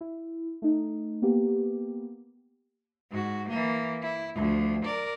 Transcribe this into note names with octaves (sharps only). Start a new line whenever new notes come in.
E4
A3 D#4
A#3 B3 G4
G#2 F#4
E3 A#3
E4
D2 F3
A#4 D5